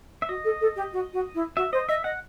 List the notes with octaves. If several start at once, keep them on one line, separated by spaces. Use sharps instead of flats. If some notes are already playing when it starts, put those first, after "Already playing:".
E5
F#4 D#5
A4
A4
G4
F#4
F#4
E4
F#4 E5
C5 D#5
D#5 E5
D#5 F#5